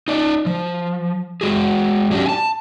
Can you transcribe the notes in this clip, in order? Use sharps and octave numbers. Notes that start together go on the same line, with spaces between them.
D#4 D5 D#5
F3
G#3 F#4 G#4
F#3 C#4 D4 G4
G#5 A5